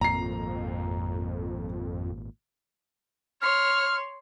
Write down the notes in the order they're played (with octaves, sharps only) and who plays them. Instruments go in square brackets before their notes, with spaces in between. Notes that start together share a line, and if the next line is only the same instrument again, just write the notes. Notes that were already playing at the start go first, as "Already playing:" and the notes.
[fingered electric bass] G#1 A#2 [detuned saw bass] F2 [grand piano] A#5 C7
[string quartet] C#5 C6 [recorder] F6